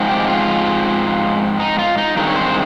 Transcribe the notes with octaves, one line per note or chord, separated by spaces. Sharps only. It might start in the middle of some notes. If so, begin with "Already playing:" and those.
Already playing: G#2 F3 G#3 C4
G4
F4
D#4
F4
D#4
G2 D#3 G#3 C4 D#4
C#5
C5